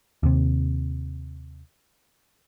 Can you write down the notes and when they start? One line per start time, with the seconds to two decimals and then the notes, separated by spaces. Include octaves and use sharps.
0.23 D#2 C3